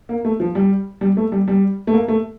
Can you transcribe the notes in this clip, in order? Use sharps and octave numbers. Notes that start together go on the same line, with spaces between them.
A#3
A3
F3
G3
G3
A3
G3
G3
A3
A#3
A3